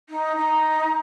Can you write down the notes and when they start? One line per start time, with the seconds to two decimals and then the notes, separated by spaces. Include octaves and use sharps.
0.09 D#4
0.37 D#4